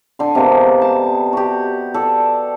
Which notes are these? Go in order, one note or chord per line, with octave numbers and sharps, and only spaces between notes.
D3 C6
C3 G#3 A#3 B3
A5
F#4 G4
A4 D5